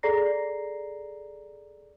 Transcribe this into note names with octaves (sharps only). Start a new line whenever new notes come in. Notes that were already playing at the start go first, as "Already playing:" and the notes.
G#4 A4 D5 A#5 A#6 C7